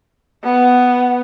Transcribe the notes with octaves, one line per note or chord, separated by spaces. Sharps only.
B3